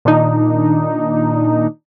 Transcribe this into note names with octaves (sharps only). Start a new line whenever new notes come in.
A#2 D#3 D4 D#4